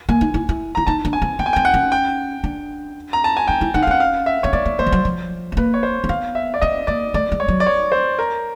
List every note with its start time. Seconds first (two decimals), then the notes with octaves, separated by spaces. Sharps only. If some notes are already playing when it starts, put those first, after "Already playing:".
0.09 A#3 G#5
0.21 D#4
0.34 E4
0.49 E4
0.75 E4 A#5
0.87 D#4 A5
1.05 D4
1.13 G#5
1.22 C4
1.39 B3 G5
1.46 G#5
1.53 G5
1.56 C4
1.65 F#5
1.74 C#4
1.92 G5
2.44 D4
3.13 A#5
3.24 A5
3.37 G#5
3.48 D#4 G5
3.61 E4
3.74 D#4 F#5
3.83 F5
3.87 C#4 F#5
4.00 F5
4.26 E5
4.43 C4 C#5
4.53 B3 D5
4.66 B3
4.79 A#3 C5
4.86 F3
4.92 F#3
5.05 F3
5.52 A3
5.57 A#3 B4
5.74 C#5
5.83 C5
6.04 C4
6.09 B3 F5
6.35 E5
6.54 D5
6.62 C4 D#5
6.87 A#3 D5
7.14 A3 D5
7.32 G#3
7.40 C#5
7.48 F#3
7.60 D5
7.66 C#5
7.92 C5
8.19 A#4